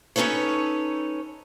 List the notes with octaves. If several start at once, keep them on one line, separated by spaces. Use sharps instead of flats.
C#4 D#4 A4 B4 C#5